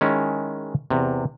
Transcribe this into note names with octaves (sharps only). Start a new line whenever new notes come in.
D#3 G#3 C#4 E4
E2 C3